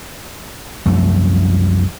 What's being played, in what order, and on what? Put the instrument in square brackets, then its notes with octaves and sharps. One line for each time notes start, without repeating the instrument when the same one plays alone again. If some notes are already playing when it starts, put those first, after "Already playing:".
[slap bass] C2 F#2 F3 A3